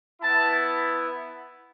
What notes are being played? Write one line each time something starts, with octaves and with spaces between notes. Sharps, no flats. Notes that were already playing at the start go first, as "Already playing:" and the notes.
B3 E4 A5